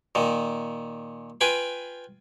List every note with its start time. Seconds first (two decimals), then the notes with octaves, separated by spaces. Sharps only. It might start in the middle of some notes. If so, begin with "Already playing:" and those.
0.15 A#2 D#3
1.41 F4 B4 G5 G#5 B5